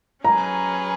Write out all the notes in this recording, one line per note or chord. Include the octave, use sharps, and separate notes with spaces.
F#3 C#4 G#4 B4 A#5